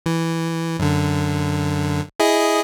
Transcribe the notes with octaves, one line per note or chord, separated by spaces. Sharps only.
E3
F#2 D3
E4 G#4 D#5